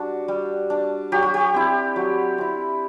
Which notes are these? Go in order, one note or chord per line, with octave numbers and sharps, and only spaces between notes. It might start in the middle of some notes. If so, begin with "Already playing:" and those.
Already playing: G3 D4 F#4
G3
D4
F#3 G4
F#4
G4
C4 E4
F#3
C4 E4